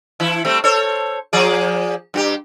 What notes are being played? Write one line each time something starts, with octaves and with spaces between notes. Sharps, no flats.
E3 E4
G3 A3 C4
A4 C5 C#5
F3 G#4 D5
G2 F#4 G4